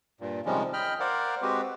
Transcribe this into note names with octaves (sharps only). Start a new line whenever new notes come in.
G2 A#2
C3 D#3 F3 G3 G#3 C#4
D#5 G5 B5 F6
A#4 C5 D5 F5 F#5
G#3 C4 F#4 G4 B4